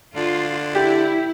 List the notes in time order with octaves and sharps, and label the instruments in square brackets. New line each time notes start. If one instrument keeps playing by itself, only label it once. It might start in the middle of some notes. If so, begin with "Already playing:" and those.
[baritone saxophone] D3 [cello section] F4
[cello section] E4 [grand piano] G4